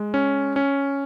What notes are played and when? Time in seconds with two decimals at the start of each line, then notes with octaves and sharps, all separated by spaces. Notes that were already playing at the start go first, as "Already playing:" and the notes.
Already playing: G#3
0.14 C#4
0.56 C#4